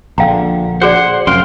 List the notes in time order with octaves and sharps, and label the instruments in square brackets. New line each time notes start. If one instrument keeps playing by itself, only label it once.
[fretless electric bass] A#1 D3 [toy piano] F5 G5 A#5
[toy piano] F#4 G#4 D5 [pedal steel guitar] C5 F#5
[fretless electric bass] F1 F#2 [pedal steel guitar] F5 G5 C6